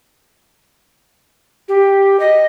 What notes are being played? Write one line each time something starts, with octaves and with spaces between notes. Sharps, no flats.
G4
D#5